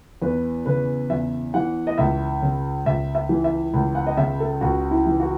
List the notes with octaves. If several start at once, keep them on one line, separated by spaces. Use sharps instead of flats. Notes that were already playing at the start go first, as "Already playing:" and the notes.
E2 B4
C#3 B4
E2 E5
E3 F#5
D#5
C#2 E5
C#3
C#2 E5
E5
E3
E5
C#2
F#5
D#5
C#3 E5
A4
C#2 F#4
E4
E3
F#4